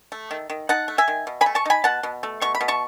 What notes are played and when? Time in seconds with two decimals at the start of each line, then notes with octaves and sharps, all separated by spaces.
0.12 A3
0.31 D#3
0.50 D#3
0.69 D#4 F#5 A5
0.88 A3
0.98 E5 G#5
1.08 D#3
1.27 B2
1.41 G#5 B5
1.46 A3
1.55 A5 C#6
1.65 D#4 G#5 B5
1.84 B2 F#5 A5
2.03 B2
2.23 A3
2.41 B2 C#6
2.55 B5
2.61 B2
2.68 A5 C#6